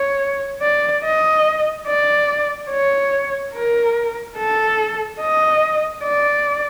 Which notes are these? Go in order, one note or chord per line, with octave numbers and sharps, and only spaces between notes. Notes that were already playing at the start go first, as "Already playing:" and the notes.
Already playing: C#5
D5
D#5
D5
C#5
A#4
A4
D#5
D5